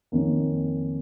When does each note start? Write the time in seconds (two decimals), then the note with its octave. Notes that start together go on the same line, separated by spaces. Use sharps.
0.12 F2 D#3 A#3 C#4